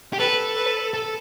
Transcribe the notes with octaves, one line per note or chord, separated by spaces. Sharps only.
G4
A4 B4
B4
A4